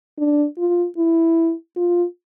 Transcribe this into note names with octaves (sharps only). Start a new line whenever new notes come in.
D4
F4
E4
F4